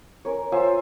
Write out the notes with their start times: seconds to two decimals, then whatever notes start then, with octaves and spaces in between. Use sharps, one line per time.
0.25 C#4 A#4 C#5
0.52 F4 C5 E5 G#5
0.65 E5